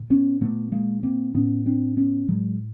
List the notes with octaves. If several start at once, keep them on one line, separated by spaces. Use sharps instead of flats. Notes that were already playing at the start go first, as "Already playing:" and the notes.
Already playing: A#2
B3 C#4
A#2 A3 B3
G#3 A#3
A#3 C4
A2 B3 C#4
C4 D4
B3 C#4
A2 F#3 G#3